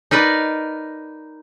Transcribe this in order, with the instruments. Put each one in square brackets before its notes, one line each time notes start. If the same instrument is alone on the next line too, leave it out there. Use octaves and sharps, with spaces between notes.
[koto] D#4 A#4 B4 D5